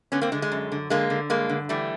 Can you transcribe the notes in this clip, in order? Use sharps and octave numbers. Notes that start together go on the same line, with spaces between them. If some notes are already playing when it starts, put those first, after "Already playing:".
D3 B3 C#4
A#3 C4
D3 G#3
G#3
F#2
D3
D3 G#3 A#3
D3
G2 G#3 A#3
D3
E3 G3 A3